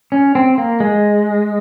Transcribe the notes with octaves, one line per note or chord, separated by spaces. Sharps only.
C#4
C4
A#3
G#3